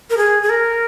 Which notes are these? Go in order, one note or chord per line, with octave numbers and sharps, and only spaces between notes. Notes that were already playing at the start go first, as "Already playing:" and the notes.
A#4
G#4
G#4
A#4